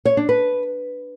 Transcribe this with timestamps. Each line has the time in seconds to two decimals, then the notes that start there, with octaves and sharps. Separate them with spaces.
0.05 C#5
0.17 D4
0.29 B4